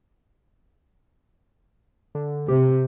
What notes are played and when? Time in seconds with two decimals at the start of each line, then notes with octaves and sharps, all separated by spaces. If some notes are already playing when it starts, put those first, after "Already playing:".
2.15 D3
2.48 C3 G4